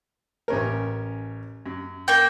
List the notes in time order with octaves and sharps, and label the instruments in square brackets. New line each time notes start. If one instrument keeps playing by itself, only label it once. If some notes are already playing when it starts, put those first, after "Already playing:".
[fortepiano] A1 C#4 A#4
F#2
[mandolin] A#3 G5